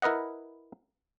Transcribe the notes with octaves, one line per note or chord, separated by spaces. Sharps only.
E4 A#4 B4 D#5 F#5